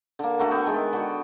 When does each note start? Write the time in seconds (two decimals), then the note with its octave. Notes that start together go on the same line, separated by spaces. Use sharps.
0.19 D3 A#3
0.39 D3 A3 F#4 A#4
0.51 B3 G5
0.66 D#3 G#3 G#4
0.93 D3 F#4 G5